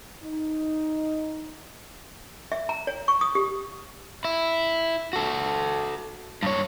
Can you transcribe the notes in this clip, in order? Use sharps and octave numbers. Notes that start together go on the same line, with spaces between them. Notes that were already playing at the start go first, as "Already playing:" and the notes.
D#4
E5
A#5
C#5
C#6
D#6
G4
E4
F#4 A4
G2 C#5